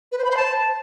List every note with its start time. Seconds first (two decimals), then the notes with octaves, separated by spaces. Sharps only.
0.12 B4
0.18 C5
0.24 B5
0.31 C5
0.37 A5